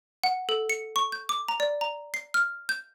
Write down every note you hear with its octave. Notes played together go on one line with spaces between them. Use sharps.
F#5
A4
C#7
C#6
G6
D6
A#5
D5
A#5
C7
F6
G6